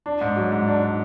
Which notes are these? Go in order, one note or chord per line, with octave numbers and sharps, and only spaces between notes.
D4
G#2
F#3
G#2
D4
D4